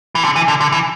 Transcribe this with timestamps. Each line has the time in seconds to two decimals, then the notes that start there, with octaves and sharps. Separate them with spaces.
0.15 E3
0.24 D3
0.36 E3
0.48 D3
0.60 D3
0.72 E3